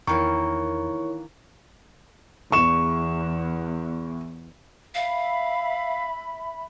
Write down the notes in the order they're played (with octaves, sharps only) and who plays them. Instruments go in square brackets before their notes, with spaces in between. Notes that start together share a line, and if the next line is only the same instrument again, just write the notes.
[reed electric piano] E2 [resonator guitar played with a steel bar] D#3 E3 A#3 [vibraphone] E4 A#4 C#5 [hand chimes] C#6
[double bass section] E2 [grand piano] C#6 E7
[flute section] E5 B5 [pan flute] F5